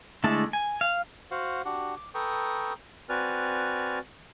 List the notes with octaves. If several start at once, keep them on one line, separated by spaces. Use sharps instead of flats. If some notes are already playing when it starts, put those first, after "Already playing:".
D3 G#3 A3 E4 A5
G#5
F5
F#4 C5 F5 F#5
D4 F#4 G4 F#5
D6
A4 B4 G5 A#5 C#6 D#6
C4 F#4 B4 D5 G#5 F6